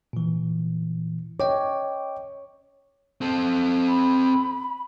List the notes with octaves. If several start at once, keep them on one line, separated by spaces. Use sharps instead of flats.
A#2 E3
C#5 D#5 G5 D6
C4 A4
B5